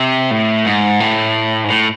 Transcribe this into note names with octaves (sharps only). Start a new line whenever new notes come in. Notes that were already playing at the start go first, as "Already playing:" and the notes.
Already playing: C3
A2
G#2
A2
G#2
A2